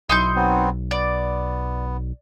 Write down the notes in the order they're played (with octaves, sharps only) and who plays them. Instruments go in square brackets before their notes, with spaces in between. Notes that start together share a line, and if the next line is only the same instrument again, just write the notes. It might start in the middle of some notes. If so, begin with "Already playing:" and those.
[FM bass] B1 [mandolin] D#4 C6 G6 [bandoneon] E4
[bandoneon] F#3 B3 C4
[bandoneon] B3 [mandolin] D5